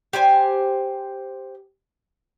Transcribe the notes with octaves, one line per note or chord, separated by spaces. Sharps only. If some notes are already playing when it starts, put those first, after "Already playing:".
G4 C5 G#5